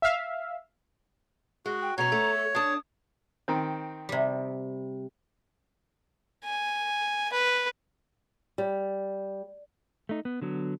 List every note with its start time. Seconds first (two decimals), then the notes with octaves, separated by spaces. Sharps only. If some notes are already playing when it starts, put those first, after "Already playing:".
0.02 E5 F5
1.66 G#3 F#4
1.82 G5
1.98 B2 F#3 C#4 C#5 A#5
2.12 A3
2.35 A4
2.55 D4 A5 D#6
3.48 D#3 C4
4.09 C3 G3
6.44 G#5
7.32 B4
8.58 G3
10.09 A3 D#4
10.25 B3
10.42 D3 F#3 B3